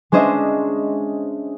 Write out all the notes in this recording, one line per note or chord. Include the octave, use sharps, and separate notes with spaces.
G#3 C#4 D4 C5 D#5 E5